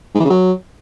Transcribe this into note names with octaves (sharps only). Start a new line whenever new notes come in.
G#2
E3
C#3
F#3